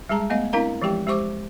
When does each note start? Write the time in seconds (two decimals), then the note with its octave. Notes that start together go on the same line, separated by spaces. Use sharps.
0.09 G3 G#3 G#4 A5 A#5
0.30 A3 B3 D#5 F5
0.53 C4 D4 E4 A#4 F5 A#5
0.82 E3 F3 G#3 G4 G5
1.07 G#3 G4 C5 C#6 D6